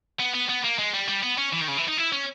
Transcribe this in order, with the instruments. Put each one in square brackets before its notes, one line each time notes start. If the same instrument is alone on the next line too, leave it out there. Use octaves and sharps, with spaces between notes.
[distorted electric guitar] B3
B3
B3
A#3
G#3
G3
G3
B3
C#4
E3
D#3
C#3
E3
D#4
E4
C#4